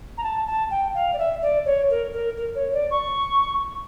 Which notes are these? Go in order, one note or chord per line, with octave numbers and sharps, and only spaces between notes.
A#5
A5
A5
G5
F5
D5
E5
D5
C#5
A#4
A#4
A#4
C#5
D5
C#6